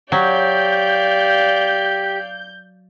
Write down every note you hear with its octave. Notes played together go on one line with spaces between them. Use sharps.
F#3 G4 D5 F5 G6